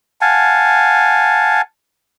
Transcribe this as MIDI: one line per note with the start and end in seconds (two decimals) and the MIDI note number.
0.21 1.62 77
0.21 1.62 78
0.21 1.62 80
0.21 1.62 81